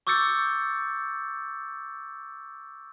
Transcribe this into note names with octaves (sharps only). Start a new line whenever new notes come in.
C#6 D6 E6 G6 A6 C#7